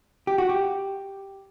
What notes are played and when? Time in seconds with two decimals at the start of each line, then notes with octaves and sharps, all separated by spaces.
0.27 G4
0.38 F#4
0.49 G4